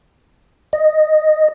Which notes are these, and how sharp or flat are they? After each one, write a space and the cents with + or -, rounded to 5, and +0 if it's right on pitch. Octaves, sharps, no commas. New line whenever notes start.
D#5 -5